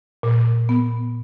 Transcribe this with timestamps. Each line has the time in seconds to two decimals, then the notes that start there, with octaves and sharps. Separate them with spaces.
0.23 A#2
0.69 B3